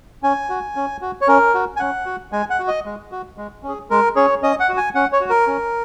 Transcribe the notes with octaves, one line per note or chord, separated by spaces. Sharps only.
C#4 G#5
F#4
C#4
F#4
C#5
C#4 A#4
F#4
G#5
C#4 F#5
F#4
G#3 G#5
F#5
F#4
D#5
G#3
F#4
G#3
C#4
G#4
G#3 A#4
C#4 G#4 C#5
C#4 D#5
F#5
F#4
G#5
C#4 F#5
C#5
F#4
A#4
C#4